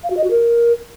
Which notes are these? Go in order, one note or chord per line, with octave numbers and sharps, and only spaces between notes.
F5
F#4
D#5
F#4
A#4